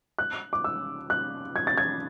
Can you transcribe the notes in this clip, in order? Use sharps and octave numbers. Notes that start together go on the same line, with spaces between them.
F#6
D6
E6
F#6
G#6
A6
G#6